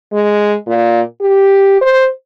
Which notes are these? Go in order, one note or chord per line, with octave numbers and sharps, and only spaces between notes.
G#3
A#2
G4
C5